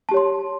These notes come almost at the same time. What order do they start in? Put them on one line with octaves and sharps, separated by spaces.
A5 G4 C#5 C6